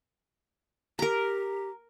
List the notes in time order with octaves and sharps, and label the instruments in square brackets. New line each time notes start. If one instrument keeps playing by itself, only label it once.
[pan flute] G4 [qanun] A#4 A#5